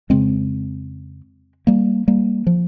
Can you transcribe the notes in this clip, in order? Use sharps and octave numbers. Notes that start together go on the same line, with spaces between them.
F2 C#3 G#3 C4
G3 A#3
G3 A#3
F3